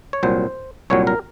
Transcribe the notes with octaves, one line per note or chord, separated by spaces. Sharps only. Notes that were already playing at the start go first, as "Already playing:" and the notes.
C#5
C2 A#2 F#3 C5
C2 A#2 F#3 C#5
A#4